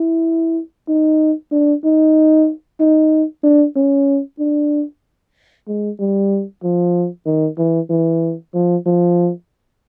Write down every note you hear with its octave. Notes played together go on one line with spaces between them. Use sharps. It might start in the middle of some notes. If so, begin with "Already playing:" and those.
Already playing: E4
D#4
D4
D#4
D#4
D4
C#4
D4
G#3
G3
F3
D#3
E3
E3
F3
F3